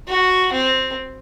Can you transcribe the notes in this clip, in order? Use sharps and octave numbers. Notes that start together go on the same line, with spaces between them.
F#4
C4